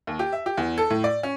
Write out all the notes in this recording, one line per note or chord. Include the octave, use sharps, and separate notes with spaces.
D#2
G4
E5
G4
E2
A4
A2
D5
C#4